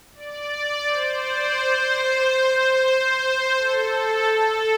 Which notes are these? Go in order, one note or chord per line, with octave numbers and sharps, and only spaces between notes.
D5
C5
D5
C5
C5
C5
A4
A4